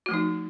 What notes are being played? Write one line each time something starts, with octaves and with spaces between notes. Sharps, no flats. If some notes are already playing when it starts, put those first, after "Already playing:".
F3 A3 D#4 F#4